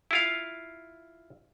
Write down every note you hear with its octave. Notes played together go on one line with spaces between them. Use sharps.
E4 F4 F5